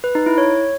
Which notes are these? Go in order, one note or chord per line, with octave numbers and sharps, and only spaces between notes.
B4
D#4
E4
C#5